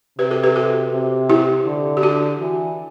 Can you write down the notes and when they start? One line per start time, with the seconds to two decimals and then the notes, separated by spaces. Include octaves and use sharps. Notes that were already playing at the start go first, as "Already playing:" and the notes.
0.19 C3 G4 B4
0.31 F#4 A4
0.43 G4 B4
0.56 F#4 A4
0.92 C3
1.30 E4 G4
1.66 D3
1.97 G4
2.03 D4 F#4
2.40 E3